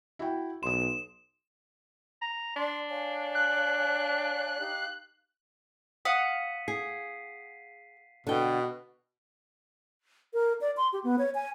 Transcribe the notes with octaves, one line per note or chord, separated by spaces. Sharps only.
E4 F#4 G5
B1 C6 D#6 E7
A#5
D4 D5 C6
C#5 F5 G#5
F#6
D#4 G4 F5
F5 F#5 D#6 B6 C#7 D#7
G#4 C7
B2 D3 G5
A#4
D5
C6
G4
B3
C#5
G#5